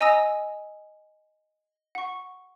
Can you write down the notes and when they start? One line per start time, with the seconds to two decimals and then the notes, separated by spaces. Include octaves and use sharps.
0.01 D#5 G#5 A#5 D#6 E6 A#6
1.95 F#5 C#6